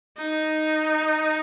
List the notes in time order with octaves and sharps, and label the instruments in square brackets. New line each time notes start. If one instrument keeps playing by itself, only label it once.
[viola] D#4